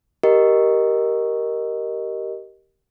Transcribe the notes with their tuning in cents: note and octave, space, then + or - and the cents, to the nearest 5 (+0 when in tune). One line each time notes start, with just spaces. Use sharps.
G4 -15 A#4 +0 D#5 -5